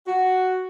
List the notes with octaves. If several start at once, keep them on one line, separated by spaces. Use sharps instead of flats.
F#4